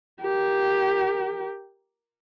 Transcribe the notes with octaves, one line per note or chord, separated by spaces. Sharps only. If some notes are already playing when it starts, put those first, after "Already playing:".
G4 A#4